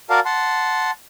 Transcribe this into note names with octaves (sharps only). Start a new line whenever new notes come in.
F#4 A#4 D5 F5 A5
F#5 A5 C6